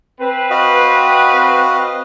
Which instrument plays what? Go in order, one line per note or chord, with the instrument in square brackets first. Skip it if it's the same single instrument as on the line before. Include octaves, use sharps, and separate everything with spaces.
[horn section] C4 B4
[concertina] F#4 D#5 F5